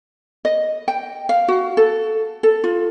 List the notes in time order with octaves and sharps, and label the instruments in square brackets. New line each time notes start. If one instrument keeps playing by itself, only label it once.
[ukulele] D#5
G5
F5
F#4
A4
A4
F4